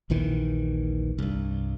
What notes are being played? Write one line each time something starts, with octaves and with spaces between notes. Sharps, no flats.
A#1 D#2 D#3 E3
C2 G2